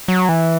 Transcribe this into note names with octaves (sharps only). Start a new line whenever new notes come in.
F#3
E3